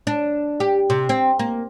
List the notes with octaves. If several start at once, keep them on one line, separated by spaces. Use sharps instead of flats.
D4
G4
C3
C4
A#3